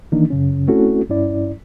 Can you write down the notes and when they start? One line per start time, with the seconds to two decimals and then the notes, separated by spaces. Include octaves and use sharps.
0.12 D#3 E3 A#3 D4 D#4
0.30 F#2 C#3 C#4
0.68 A3 C4 C#4 E4 F#4 A4
1.09 G2 C#4 E4 D5